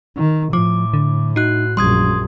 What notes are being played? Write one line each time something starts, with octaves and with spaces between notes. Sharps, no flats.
D#3
A2 F3 D6
D3
D#4 F#4 F#6
A#1 F#2 G3 C6 D#6 G#6